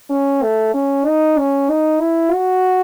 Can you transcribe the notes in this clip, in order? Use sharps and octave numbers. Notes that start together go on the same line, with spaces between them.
C#4
A3
C#4
D#4
C#4
D#4
E4
F#4